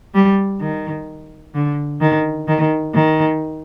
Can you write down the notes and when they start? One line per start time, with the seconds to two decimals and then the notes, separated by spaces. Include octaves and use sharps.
0.14 G3
0.60 D#3
1.54 D3
2.00 D#3
2.48 D#3
2.94 D#3